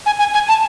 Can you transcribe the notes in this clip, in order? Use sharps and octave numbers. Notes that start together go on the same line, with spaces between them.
G#5
G#5
G#5
A5